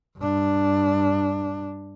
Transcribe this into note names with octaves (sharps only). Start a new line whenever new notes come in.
G2 D4